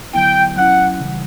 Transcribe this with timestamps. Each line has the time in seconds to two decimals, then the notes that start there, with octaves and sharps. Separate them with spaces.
0.14 D3 F#3 B3 E4 G5
0.57 F#3 C#4 E4 F#5
1.00 C#3 E3 G3